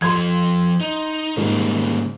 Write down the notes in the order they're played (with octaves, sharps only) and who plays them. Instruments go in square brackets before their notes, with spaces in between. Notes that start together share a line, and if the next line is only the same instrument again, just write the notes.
[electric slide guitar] F3 A4 [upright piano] C6 G#6
[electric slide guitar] D#4
[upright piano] G#2 [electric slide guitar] C#3 G3 A#3